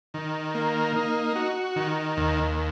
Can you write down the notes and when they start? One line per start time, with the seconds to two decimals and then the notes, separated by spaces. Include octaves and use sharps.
0.14 D#3
0.55 A#3
0.96 D#4
1.36 F#4
1.76 D#3
2.17 D#2